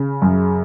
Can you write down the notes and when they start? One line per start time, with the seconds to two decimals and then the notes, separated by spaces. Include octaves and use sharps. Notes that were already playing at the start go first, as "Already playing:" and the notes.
Already playing: C#3
0.22 F#2